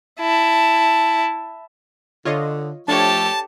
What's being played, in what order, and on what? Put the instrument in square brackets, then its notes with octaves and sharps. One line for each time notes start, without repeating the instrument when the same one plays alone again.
[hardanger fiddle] E4 A5
[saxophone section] D3 [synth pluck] F4 C#5 D#5
[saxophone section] F3 A3 [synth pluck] D4 C#5 [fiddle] G4 A4 [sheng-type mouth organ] A5